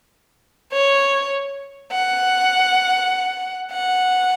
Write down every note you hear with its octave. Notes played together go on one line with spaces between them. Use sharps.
C#5
F#5
F#5